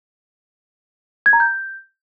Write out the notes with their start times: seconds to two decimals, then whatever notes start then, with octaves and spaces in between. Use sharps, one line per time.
1.26 G#6
1.33 A#5
1.40 G6